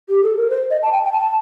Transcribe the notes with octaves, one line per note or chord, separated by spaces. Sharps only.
G4
A4
A#4
C5
D#5
A5
G5
G5
A5